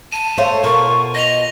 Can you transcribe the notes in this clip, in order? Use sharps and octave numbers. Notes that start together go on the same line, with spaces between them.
A5 D#7
A3 A4 C5 C#5 E5 F5
B2 F4 A#4 C#6
D#5 A#6 F7